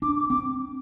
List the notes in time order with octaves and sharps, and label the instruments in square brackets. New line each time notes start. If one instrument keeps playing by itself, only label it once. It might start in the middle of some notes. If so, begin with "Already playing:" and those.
[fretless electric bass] D4 [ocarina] D6
[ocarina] D6
[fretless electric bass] C4 [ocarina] D6